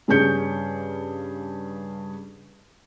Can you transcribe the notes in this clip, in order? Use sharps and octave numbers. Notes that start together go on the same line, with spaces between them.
G2 C#3 C#4 G#4 G6 C#7